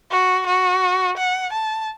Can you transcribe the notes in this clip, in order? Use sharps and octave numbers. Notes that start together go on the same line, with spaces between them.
F#4
F#4
F#5
A5